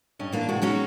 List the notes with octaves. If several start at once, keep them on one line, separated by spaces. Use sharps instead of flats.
G2 C#4 D#5
E3 A#3 D4
A2 C3 G#3 F#4
F#3 G#3 C#4 D#4 F#4